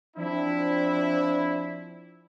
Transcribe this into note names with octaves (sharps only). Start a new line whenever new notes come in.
F3 C4 D4 E4